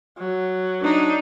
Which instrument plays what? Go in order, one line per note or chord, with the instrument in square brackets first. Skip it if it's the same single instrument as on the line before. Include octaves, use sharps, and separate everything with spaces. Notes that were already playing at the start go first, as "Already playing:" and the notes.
[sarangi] F#3
[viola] D4 D#4